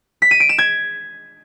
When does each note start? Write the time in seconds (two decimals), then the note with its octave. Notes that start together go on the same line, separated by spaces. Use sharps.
0.22 B6
0.31 D#7
0.40 D7
0.49 E7
0.58 G#6